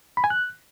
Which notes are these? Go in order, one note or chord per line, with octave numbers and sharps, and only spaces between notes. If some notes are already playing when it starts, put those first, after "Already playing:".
B5
G#5
F#6